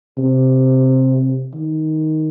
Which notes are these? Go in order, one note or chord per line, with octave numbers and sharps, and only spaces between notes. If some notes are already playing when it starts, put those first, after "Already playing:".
C3
D#3